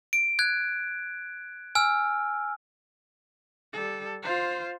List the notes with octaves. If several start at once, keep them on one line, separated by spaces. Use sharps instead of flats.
D7
F#6 G#6
G#5 E6 F6
G3 A4
F4 C5